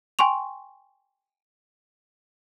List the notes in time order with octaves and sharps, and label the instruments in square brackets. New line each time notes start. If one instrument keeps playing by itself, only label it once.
[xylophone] G5 G#5 C6 C#6 F7